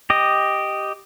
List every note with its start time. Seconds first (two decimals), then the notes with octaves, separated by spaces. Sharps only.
0.10 G4 D#5